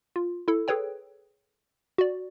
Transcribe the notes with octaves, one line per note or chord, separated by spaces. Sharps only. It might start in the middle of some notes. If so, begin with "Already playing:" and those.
F4
E4 A4
G#4 A4 B4 C#5 G5
F#4 D5